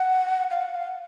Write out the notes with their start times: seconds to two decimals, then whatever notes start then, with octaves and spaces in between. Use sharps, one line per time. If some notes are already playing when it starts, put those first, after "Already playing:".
Already playing: F#5
0.51 F5
0.62 F#5
0.74 F5